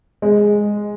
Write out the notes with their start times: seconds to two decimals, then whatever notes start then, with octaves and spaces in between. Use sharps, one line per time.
0.22 G#3